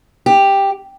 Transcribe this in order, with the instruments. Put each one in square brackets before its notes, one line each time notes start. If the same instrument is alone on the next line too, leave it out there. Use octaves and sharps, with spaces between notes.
[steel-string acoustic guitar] G4